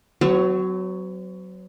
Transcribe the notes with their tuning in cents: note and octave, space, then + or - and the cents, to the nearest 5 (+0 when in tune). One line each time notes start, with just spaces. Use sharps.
F#3 +10 C4 -45 C#5 +5